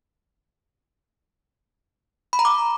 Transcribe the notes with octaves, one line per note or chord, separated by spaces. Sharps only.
B5
A#5
D6